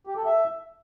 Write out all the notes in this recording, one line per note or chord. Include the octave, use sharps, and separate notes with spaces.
G4
A4
E5